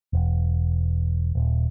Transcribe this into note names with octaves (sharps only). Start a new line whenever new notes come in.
E1
D#1